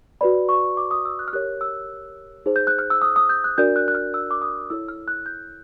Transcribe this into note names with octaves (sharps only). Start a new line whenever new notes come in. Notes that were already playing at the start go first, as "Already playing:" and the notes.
F#4 B4 D5 B5
C#6
D6
D#6
E6
F#6
F6
G4 A#4 C#5 F#6
E6
D#4 G#4 C5
G6
F#6
F6
E6
D#6
D#6
G6
F#6
D4 F#4 A#4 D5 G6
F#6
F#6
F6
E6
D6
D#6
E4 A4 C#5 E6
F6
F#6
G6